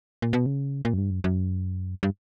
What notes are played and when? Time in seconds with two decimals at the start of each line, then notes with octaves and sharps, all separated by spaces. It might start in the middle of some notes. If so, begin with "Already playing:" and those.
0.22 A#2
0.33 B2
0.46 C#3
0.85 A#2
0.93 F#2
0.98 G2
1.11 F#2
1.24 F#2
2.03 G2